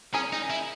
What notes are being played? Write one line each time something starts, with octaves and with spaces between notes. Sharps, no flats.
C#4 G#4 A#4
D#4
E4